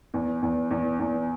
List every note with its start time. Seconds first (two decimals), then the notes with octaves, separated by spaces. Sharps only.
0.14 E2
0.43 E2
0.71 E2
1.00 E2